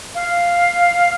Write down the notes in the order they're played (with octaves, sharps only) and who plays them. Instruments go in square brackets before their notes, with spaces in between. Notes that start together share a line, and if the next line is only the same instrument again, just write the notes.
[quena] F5